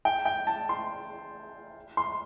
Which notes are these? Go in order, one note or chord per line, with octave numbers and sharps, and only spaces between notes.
G5
G5
A5
C6
C6